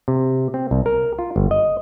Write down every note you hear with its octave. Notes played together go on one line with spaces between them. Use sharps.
C3
C4
C2
A#4
F4
G1
D#5